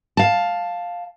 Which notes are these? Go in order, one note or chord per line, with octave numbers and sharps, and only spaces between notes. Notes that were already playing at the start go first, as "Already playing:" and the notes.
F5 A5